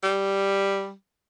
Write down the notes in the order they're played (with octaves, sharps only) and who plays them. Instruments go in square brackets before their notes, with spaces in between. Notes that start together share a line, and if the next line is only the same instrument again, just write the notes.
[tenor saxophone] G3